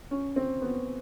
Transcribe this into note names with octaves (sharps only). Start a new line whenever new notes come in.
C#4
C4
B3